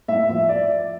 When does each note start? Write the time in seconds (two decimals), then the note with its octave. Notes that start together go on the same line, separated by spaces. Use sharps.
0.08 A2 E5
0.29 F3 E5
0.49 D5